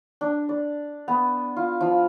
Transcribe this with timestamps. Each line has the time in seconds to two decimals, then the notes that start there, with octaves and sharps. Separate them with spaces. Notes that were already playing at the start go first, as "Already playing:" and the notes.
0.21 D4
0.49 D5
1.08 B3
1.57 F4
1.81 F3